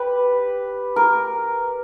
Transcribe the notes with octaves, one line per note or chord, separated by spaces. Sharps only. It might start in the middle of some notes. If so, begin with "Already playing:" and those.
Already playing: G4 B4
A#4